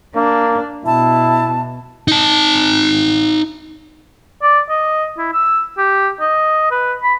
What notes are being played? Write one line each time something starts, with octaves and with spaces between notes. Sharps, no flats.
A#3 D4
B2 E4 A5
D#4 A5
D5
D#5
E4
E6
G4
D#5
B4
B5